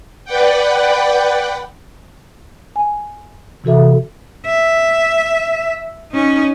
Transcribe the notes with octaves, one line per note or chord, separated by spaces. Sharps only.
B4 D5 F#5 G5
G#5
C3 E3 F#4 A4 E5
E5
C#4 D#4